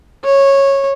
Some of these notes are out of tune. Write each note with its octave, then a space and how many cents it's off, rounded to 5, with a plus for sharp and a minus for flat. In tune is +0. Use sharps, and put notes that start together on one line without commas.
C#5 -15